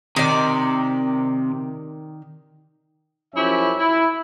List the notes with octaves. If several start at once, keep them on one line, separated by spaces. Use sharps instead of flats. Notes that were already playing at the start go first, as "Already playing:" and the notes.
C3 D#3 D5
F#2 F3 C#4 E4 G4 E5
E4